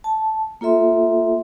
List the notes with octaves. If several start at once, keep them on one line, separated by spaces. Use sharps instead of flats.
A5
A#3 F4 A4 E5 C6